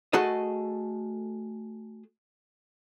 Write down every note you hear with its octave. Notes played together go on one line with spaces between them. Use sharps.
A3 F#4 G#4 A4 D#5